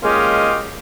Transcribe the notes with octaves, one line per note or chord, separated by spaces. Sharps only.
G#3 A#3 C#4 F4 G4 D#5